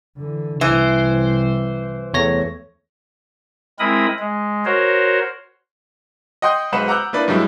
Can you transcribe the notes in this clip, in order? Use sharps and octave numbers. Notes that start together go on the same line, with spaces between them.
D3 E3
C2 E3 C5
E2 A3 C#5 A#6
G#3 C4 E4 A#4 B5 D#6
G#3
F#4 A#4 C5 C#5
D#5 F#5 G5 C6 D#6 G6
B1 G#3 B4 C5 F#5 E7
F#5 A#5 D6 E6 F#6 G6
A#3 D4 E4 B4 D5
G2 F#3 G#3 E4 E5